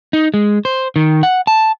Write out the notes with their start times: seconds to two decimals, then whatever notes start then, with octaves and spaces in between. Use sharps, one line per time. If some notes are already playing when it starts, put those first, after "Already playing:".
0.13 D#4
0.34 G#3
0.65 C5
0.96 D#3
1.23 F#5
1.47 A5